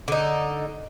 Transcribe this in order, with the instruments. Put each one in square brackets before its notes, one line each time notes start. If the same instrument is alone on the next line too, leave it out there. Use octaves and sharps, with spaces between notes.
[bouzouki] D3 D#4